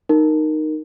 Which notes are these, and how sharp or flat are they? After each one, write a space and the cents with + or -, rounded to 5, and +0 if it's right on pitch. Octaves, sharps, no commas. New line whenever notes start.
D#4 -10 A#4 -5